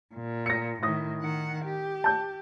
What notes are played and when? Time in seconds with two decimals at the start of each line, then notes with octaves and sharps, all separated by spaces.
0.14 A#2
0.46 A#6 C#7
0.83 A2 D#3 D#6 A#6
1.22 D#3 F#5
1.65 G4
2.04 A5 G6